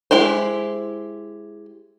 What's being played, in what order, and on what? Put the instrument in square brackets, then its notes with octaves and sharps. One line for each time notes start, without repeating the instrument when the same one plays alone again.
[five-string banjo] G#3 E4 G4 C5